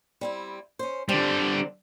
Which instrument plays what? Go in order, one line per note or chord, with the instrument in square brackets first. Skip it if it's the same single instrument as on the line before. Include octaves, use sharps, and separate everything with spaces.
[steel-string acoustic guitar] G3 C4 E4
C#4 C5
[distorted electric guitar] D3 G3 [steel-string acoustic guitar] C4 D4 A4